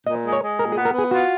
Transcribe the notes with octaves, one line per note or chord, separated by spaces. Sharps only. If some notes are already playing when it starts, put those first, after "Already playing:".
A#2 D#5
G#3
C#5
G#3
A#2 A#4
G#4
B3
A#4
B3
G#4
F4 F#4